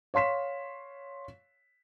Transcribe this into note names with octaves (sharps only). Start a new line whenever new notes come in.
C#5 F5 C6 B6 E7